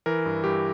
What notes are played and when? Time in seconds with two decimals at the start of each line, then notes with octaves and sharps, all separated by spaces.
0.06 E3 A#4
0.26 G2
0.44 G2 G4